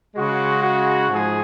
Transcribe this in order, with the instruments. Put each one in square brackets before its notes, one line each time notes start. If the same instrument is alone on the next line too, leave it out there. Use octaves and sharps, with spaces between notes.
[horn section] C#3 G#3 F#4
F#4
G#2 F3 G#4